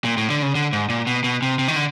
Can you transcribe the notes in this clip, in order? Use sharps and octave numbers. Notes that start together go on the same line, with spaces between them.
A#2
A2
D3
C#3
D3
G#2
A#2
B2
B2
C3
C3
D#3
D3